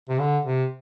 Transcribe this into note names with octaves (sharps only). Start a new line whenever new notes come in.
C3
D3
C3